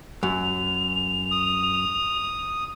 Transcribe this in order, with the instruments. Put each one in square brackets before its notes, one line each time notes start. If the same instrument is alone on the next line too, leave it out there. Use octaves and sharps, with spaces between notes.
[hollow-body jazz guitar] F#2 [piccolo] F7
[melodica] D#6